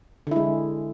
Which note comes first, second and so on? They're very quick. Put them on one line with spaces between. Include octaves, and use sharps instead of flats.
D3 E4 G#3